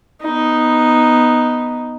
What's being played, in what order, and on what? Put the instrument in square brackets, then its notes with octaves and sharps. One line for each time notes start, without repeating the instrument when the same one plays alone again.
[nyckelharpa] B3 D#4